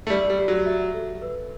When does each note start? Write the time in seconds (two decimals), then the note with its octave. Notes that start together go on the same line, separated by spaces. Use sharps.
0.07 A3
0.10 G3 D5
0.30 G3
0.39 G4
0.48 F#3
0.66 E5
0.94 A4
1.22 B4